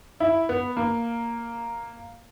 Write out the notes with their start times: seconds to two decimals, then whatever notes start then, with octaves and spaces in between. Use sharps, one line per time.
0.20 E4
0.49 B3
0.77 A#3